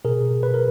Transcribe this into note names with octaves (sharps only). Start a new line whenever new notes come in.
B2 G#4 A#4
B2
B4
A#4